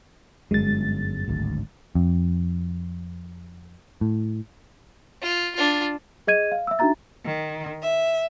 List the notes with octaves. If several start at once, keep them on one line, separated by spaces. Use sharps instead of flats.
G1 F#2 G#3 A6
D1 G#1 D2
F2
A2
F4
D4 F4
G#4 D#5 G#6 D#7
F5
E5 E6
D4 D#4 F#4 E5 A#5 A6
D#3
E5